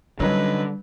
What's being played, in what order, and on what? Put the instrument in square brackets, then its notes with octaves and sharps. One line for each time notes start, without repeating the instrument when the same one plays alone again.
[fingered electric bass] D3 [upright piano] F#3 C#4 D#4 [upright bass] G3 [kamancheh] B4